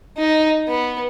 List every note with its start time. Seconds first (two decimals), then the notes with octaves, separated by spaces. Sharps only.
0.18 D#4
0.68 B3